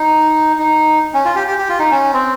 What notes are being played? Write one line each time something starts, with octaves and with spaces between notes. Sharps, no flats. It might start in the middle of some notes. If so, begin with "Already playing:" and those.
Already playing: D#4
D#4
C#4
F4
G4
G4
G4
F4
D#4
C#4
C4